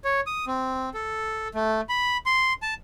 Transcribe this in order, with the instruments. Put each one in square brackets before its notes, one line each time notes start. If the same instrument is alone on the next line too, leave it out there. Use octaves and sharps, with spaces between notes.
[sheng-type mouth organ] C#5
D#6
C4
A4
A3
B5
C6
A5